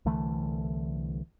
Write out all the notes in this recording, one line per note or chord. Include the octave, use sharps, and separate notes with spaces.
C2 D3 E3 A3